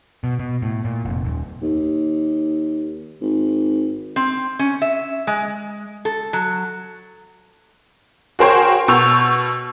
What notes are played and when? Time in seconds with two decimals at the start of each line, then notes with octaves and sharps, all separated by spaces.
0.24 B2
0.39 B2
0.62 A2
0.85 A#2
1.05 F1
1.25 D#1
1.62 D#2
3.21 G#1
4.16 C4
4.59 C#4
4.82 E5
5.27 G#3
6.05 A4
6.33 F#3
8.39 F#4 G#4 A#4 C5 C#5 G5
8.88 B2 C#6 E6 G6 F7